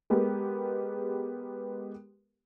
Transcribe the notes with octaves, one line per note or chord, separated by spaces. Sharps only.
G#3 B3 G4 A#4